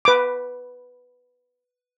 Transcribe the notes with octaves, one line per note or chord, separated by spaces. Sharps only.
B4 D6